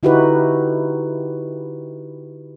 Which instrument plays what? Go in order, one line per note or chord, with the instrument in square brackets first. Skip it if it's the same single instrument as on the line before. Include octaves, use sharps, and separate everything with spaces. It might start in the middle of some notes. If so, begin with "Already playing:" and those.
[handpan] D3 D#4 E4 F#4 G4 B4